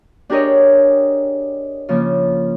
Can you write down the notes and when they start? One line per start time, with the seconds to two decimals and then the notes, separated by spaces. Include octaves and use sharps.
0.30 D4 G4 G#4 A#4 C#5 D#5
1.89 C#3 F3 A#3